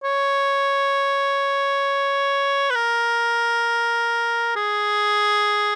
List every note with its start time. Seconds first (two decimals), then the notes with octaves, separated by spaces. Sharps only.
0.04 C#5
2.71 B4
2.75 A#4
4.56 G#4